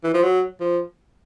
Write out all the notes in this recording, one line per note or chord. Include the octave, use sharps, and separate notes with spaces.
E3
F3
F#3
F3